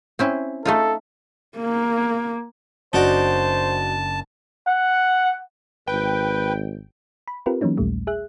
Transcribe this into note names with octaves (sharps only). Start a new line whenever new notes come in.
C4 C#4 E4
A3 D#4 F4 A4
A#3
F#1 F#3 D4 D#4 F#4 C5 D5 A5
F#5
G#1 B4 G5
B5
C4 F4 G4 A#4 B4
E3 F#3 A#3 C#4 D#4
A#1 D#2 A#2 G3 A3
G#4 E5 F#6